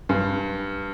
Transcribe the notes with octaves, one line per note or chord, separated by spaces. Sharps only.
G2